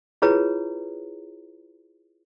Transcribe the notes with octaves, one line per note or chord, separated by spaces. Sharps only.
E4 F4 G#4 B4 C#5 A#5